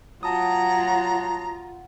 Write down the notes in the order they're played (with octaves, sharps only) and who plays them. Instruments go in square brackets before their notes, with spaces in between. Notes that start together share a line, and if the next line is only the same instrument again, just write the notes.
[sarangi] F#3 [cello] F4 [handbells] A5 D#6 [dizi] A#5